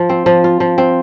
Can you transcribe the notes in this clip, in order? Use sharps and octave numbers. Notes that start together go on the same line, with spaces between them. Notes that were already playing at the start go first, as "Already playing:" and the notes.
Already playing: F3 F4
C4
F3
F4
F3
C4